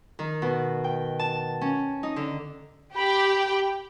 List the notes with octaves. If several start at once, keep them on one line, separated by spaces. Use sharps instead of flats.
D#3
B2
G5
A5
C#4
D#4
D3
G4 G5 B5